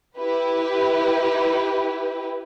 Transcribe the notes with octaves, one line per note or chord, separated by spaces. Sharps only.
E4 G4 B4